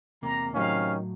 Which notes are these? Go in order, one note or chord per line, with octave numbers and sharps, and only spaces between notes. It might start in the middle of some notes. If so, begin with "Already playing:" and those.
E2 C3 A#3 A#5
A2 C3 D#3 F#3 C#4 F5